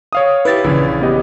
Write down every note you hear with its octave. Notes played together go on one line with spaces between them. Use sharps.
C#5 F5 D#6
E4 G4 B4 A6
A#1 C#3 E3
B3 G4 D#5